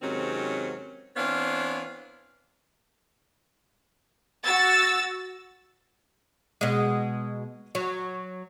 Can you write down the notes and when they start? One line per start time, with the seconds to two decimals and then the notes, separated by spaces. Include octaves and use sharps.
0.02 G#2 C3 D#3 F#3 C4 C#4
1.16 E3 B3 C4 D4 C#5 F5
4.45 F#4 E6 A6
6.61 B2 G#3
7.75 F#3